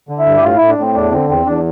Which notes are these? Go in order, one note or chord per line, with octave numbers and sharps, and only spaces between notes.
D3
E4
G2
G4
A2 F4
A2 E4
D4
A2 C4
E2 D4
D3 C4
E2 C4
E2 D4